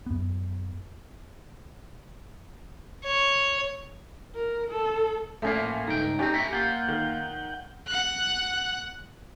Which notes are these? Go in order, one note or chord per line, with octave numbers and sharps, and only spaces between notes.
F#2 B3
C#5
A#4
A4
A2 F3 A3 A#3 C#4
C#2 G2 D#4 G5 A#5
A3 C4 C#4 G4
A3 E4 F#4
A#3 F4 F#5 G6
D#3
F#5 F#6